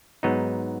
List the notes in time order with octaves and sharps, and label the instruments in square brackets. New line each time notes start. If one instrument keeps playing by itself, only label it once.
[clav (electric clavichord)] G#2 F#3 B3 D#4